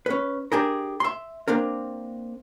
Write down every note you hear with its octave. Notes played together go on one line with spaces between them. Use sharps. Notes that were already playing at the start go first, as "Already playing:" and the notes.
C#4 B4
D4 G4 G#4 A#4
E5 C6
A#3 C4 D4 A#4